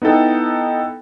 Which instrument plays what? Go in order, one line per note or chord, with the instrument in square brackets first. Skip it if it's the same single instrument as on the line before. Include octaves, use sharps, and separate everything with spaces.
[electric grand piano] B3 D#4 E4 A4 G5